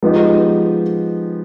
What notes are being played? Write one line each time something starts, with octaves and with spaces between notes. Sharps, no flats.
F3 G#3 B3 D#4 G4